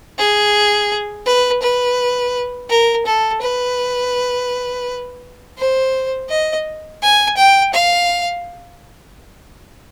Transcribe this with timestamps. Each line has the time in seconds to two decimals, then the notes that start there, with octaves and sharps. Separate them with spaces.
0.19 G#4
1.26 B4
1.62 B4
2.70 A#4
3.06 A4
3.42 B4
5.58 C5
6.30 D#5
7.03 G#5
7.37 G5
7.74 F5